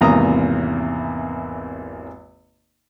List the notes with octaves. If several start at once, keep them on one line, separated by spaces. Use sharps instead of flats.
G#1 E2 C3 A#3 A#5 D#6